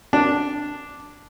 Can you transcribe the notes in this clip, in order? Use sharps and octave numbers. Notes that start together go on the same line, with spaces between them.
D4